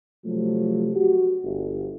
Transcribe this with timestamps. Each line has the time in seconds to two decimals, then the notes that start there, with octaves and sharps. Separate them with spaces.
0.25 C3 F3 F#3 A3
0.95 F#4 G4
1.44 G1